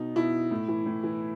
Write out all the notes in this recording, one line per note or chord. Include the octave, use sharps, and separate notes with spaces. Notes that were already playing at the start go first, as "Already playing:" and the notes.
Already playing: B2 D#4
B2 E4
A2
E3
A2
E3